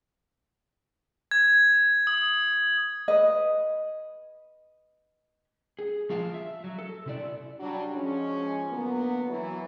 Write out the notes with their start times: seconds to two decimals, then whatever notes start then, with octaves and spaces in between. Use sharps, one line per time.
1.31 G#6
2.07 D#6
3.08 B4 D#5
5.79 G#4
6.10 F3 F4 G#4 F5 A5
6.34 E5
6.64 F#3
6.79 A4
7.06 C3 E4 D5
7.60 F#3 G3 D4
7.93 G#2 F3 G#3 C#4
8.70 D3 F#3 A#3 B3
9.29 E3 F#3